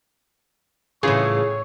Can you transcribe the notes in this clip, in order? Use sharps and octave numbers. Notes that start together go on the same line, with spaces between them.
A2 C#3 E3 F4 G#4 C#5